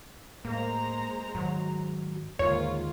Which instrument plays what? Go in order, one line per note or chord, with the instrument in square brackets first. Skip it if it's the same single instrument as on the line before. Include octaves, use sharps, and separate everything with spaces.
[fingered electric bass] A2 [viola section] G#3 C5 A#5 [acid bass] A#3
[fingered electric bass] G#2 D#3 [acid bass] F#3
[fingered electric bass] D#2 D3 D#3 [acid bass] G#2 [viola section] A#3 F4 [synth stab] C#5